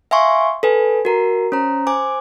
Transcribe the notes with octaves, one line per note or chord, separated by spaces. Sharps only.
E5 F5 G#5 C6 C#6
A4 B4 G#5
F#4 A#4 A#5
C#4 C5 A#5
C5 G#5 D6